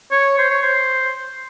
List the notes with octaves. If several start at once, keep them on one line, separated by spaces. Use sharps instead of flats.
C#5
C5
C#5
C5